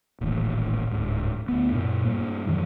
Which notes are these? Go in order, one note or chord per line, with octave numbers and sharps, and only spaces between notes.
D#1 A1 D#2
D1 G#2
D2 B3
F#2 A#2
G2 A#3
F#2 D#3 E3